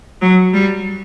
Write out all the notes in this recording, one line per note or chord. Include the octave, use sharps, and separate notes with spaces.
F#3
G3